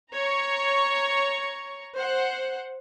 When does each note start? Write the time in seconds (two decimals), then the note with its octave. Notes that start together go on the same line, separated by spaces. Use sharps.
0.12 C#5 A#5 C#6
1.95 C5 F#5